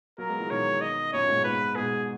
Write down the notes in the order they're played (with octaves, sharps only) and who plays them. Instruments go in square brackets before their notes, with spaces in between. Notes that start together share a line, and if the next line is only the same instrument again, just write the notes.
[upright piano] F#3 A#3 [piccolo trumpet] A#4
[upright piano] G#3 B3
E3 G#3
[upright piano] B2 D#3 [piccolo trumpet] C#5
[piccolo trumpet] D#5
[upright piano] F#2 A#2 [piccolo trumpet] C#5
[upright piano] G#2 B2
[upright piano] G#2 B2 [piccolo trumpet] B4
[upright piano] G#2 B2 [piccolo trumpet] G#4